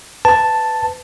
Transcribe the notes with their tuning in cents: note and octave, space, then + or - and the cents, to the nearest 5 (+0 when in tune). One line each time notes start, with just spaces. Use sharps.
B4 +20 A5 +0